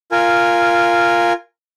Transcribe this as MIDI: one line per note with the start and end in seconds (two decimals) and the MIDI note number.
0.12 1.33 65
0.12 1.33 70
0.12 1.33 80